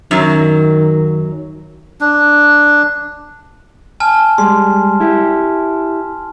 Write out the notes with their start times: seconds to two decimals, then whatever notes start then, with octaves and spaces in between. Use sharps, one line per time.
0.11 F#2 D#3 F#3
2.01 D4
4.00 G#5 A5 F6
4.38 G3 G#3 C6
5.00 E4 G4